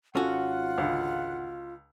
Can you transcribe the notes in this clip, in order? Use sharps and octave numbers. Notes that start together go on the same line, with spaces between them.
G#1 C#4 F4 F#4 A4 F#5
C#2 D3